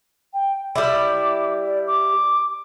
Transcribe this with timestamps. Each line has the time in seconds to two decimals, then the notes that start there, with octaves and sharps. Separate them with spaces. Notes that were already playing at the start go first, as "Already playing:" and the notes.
0.33 G5
0.75 G3 E4 D6
1.65 D5
1.87 D6